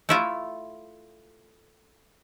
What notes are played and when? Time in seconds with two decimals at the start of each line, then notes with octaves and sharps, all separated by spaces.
0.09 A3 E4 F4